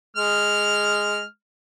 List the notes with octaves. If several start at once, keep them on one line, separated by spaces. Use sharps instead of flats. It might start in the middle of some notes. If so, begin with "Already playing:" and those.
G#3 F6